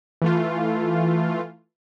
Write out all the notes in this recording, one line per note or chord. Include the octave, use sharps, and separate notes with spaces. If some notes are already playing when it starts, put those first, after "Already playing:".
E3 A3 F4